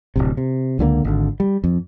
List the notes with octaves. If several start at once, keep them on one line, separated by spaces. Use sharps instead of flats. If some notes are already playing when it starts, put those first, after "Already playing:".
D1 G1 C3
C3
C#2 D3 F3 A#3
G#1 D3
G3
F2